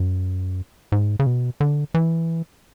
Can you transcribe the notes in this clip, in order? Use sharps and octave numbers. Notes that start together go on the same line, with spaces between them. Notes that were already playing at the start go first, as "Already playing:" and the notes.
Already playing: F#2
G#2
C#3
B2
D3
E3